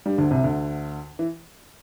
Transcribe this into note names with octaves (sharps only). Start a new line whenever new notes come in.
G2 G3
D2 D3
C2 C3
D2 D3
E3